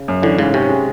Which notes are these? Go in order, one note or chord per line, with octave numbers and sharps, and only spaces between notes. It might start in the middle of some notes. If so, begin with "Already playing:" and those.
Already playing: C#3
F#2
D3 E3
G#2 C#3
C3 C#4
G#3